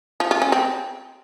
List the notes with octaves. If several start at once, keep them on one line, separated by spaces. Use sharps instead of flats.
F3
F4
C#4
C4